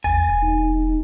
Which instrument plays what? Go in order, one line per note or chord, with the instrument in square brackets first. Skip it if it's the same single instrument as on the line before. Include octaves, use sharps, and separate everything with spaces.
[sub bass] A1 [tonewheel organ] E2 A6 [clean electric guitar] G#5
[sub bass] E1
[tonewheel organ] D#4